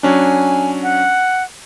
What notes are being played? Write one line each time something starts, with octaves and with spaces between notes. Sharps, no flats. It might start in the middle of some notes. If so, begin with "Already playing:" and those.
F#3 C#4 D4 G#5
F#5